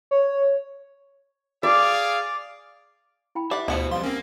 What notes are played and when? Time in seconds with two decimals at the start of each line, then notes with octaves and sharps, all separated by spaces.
0.11 C#5
1.63 G#4 D5 F5
3.35 E4 G5 B5
3.51 G4 D5 E5 F#5
3.68 D2 B2 F3 B3 E4 C#7
3.91 F2 G3 F5 C6
4.03 A#3 C4 C#4